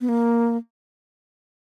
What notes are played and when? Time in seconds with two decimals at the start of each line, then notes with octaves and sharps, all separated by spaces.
0.01 B3
0.09 A#3